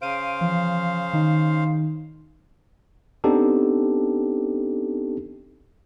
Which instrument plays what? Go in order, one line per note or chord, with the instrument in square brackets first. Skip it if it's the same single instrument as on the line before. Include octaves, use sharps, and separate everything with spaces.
[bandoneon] C#3 C5 F5 [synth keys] D7 D#7
[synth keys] E3 F3
D#3 D#4
[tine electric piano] B3 C4 D4 D#4 G4 A4